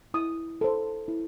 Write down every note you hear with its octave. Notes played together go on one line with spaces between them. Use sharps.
E4 D#6
A4 C5
E4